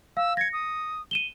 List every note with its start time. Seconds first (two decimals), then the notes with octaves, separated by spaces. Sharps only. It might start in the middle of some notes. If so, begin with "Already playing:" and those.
0.17 F5 E6
0.37 G#6 A#6 C#7
0.53 D#6
1.11 D#7 E7 G7